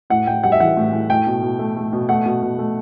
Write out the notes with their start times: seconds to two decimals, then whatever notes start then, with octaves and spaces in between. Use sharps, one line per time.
0.10 A2 F#5
0.27 A2 G5
0.44 G3 F#5
0.52 E5
0.60 E3 F#5
0.77 A2
0.93 A2
1.10 A3 G5
1.27 B2
1.43 B2
1.59 A3
1.76 A3
1.93 B2
2.09 A3 F#5
2.26 B2
2.42 B2
2.59 A3